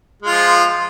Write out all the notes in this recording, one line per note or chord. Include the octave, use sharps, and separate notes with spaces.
F3 G#3 F4